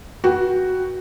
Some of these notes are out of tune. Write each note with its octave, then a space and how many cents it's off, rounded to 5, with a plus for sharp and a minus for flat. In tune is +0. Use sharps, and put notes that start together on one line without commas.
F#4 +5 B4 -30 G5 +0